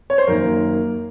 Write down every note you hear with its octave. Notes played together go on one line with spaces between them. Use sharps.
C#5
C5
F#2 D#3 A#3 A#4